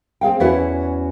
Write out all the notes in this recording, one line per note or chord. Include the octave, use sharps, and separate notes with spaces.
C4 G#4 F5 G5
E2 C#4 E4 F#4 B4 F#5